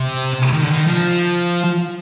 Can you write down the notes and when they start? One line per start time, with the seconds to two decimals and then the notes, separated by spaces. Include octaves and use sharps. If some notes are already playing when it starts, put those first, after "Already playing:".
Already playing: C3
0.52 D#3
0.63 D3
0.70 D#3
0.87 F3